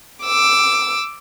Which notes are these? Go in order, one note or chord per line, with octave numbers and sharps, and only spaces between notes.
D6 E6